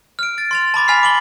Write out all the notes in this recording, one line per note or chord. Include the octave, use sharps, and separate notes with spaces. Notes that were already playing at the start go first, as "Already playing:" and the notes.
F6 D7
A6
C6 A6 F7
A5 B5 D6 A6
G#5 B5 F6 B6 C7
D6 F#7 G7